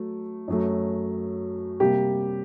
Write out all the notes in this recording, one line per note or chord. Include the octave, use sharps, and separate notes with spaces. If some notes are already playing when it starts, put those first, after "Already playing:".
Already playing: F#3 A3
F#2 F#3 A3
C3 G3 A#3 G4